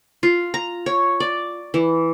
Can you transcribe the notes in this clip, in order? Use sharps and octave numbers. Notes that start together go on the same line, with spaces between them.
F4
A#5
C#5
D5
E3